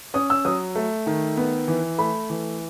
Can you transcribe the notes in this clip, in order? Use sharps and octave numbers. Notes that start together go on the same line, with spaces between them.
C#4 D#6
E6
F#3 D#6
A3
D#3
B3
E3
A3 B5
E3